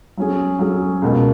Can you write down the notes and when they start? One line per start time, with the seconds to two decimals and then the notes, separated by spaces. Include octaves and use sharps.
0.17 F#3 C#4 G#4
0.59 F#3 C#4 G#4
1.02 C#2 B2 A#3